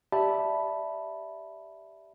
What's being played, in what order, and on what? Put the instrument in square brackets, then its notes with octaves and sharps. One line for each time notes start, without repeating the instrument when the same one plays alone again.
[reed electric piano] G4 D5 E5 A5 B5